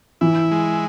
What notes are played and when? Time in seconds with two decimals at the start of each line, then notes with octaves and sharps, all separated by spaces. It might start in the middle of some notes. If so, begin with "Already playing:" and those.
0.21 E3 E4
0.51 G#3